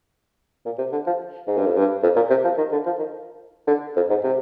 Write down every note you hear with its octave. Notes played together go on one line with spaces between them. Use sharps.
A#2
C3
D3
F3
G#2
G2
F2
G2
F2
A#2
C3
F3
D#3
D3
F3
D#3
D3
F2
G#2
C3